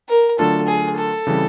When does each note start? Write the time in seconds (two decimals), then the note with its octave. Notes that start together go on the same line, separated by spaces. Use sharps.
0.09 A#4
0.39 D3 F#3 A3 D4 F4 A4
0.68 G#4
0.97 A4
1.27 C#3 E3 G3 C4